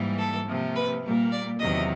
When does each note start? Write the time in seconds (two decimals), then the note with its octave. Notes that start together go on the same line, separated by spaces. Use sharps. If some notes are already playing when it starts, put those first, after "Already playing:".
Already playing: G#2 E3 G3 A#3
0.18 A4
0.46 C3 F3 A#3
0.75 B4
1.03 A#2 G3 A#3
1.32 D5
1.59 E2 C3 D#3 F#3 D#5